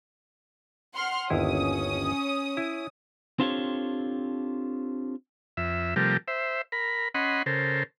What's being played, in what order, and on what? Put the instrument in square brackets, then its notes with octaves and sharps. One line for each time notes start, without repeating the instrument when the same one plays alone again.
[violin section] F#5 C6 F6
[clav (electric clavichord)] G1 D#2 E4 [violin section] C#4 D#6
[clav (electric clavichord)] E4
[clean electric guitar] C4 D4 F4 G4 A4 C#5
[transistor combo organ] F2 E5
C3 F3 G3 A3 G4 A#4
C5 E5
A#4 B5
C#4 D#5 F#5 B5 C6
C#3 A4 A#4 C5